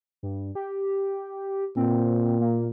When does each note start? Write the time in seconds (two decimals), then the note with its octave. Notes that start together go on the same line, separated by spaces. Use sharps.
0.23 G2
0.55 G4
1.76 A#2 C4
2.41 A#3